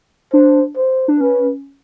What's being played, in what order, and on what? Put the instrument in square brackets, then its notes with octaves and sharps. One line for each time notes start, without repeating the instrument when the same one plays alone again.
[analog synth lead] D4 [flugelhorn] C5
[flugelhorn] C5
[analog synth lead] D4
[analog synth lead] C#4 [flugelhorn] B4